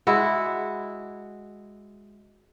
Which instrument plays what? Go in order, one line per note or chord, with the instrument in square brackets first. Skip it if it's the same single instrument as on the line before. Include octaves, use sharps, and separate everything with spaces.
[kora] G#3 E4 F#4